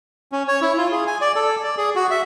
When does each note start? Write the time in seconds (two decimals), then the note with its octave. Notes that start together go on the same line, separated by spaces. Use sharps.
0.32 C#4
0.48 C#5
0.62 E4
0.78 F4
0.91 G#4
1.07 G#5
1.21 D5
1.36 A4
1.64 D5
1.77 G#4
1.96 F#4
2.11 E5